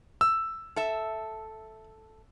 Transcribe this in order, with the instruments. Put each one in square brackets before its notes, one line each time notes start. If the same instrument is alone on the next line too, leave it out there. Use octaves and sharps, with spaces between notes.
[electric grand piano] E6
[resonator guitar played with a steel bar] A4 E5